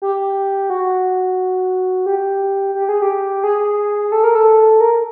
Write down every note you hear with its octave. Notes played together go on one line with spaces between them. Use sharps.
G4
F#4
G4
G4
G#4
G4
G#4
A4
A#4
A4
A#4